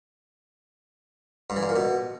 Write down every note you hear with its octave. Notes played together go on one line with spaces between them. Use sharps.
G2
E3
G2
A#2
B2